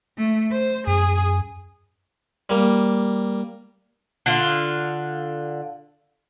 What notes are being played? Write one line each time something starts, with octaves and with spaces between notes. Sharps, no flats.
A3
C5
F#2 G#4
G3 A#3
D3 F4